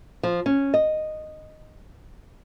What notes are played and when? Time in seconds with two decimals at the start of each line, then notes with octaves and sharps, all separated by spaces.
0.23 F3
0.46 C#4
0.74 D#5